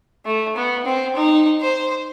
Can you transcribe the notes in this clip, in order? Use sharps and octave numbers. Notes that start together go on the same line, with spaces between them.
A3
B3
C4
D#4
C5